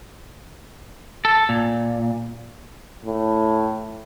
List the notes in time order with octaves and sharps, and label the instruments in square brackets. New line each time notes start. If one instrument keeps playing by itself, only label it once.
[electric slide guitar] A4
A#2
[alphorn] A2